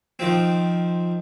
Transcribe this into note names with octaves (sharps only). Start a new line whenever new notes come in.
D#3 F3 C4